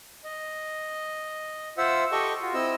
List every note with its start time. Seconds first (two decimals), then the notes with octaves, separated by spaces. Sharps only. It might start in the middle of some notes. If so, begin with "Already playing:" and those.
0.24 D#5
1.78 F4 C5 E5 F#5 E6
2.12 G4 A4 D#5 G5 C#6
2.42 F4 F#4
2.54 C4 E4 D#5 E6